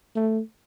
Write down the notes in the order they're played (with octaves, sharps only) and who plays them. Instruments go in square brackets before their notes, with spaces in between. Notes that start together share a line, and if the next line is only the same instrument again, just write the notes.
[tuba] A3